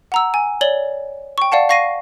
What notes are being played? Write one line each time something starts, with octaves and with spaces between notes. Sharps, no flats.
F#5 A#5 E6
G#5
C#5 D5 F#7 G7
G5 C#6
D5 F5 F#5 A5
F5 C#6 A#6 C7 D#7